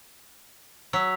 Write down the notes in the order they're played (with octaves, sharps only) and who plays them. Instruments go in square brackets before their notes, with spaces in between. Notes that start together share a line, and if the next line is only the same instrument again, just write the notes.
[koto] F#3 [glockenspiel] E6 B6 F7